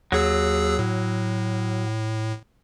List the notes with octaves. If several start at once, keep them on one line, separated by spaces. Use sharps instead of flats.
D#2 F#3 G#4 E6
A2